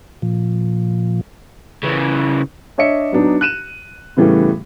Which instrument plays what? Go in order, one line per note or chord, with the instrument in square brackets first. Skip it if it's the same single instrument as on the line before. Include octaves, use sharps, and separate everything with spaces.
[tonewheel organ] A#2 F3
[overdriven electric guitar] C#3 E3
[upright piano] D4 C#5 D#5 E5 C#7
F#3 B3 D4 D#4
F#6 D#7 E7
A2 C#3 E3 G3 A3 B3